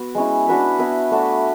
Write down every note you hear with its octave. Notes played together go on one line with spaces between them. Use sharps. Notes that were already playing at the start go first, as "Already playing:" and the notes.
Already playing: B3 F#4
G#3 C#4 E4
D4 F#4 B4 E5
B3 E4 B4 E5
A3 D4 F#4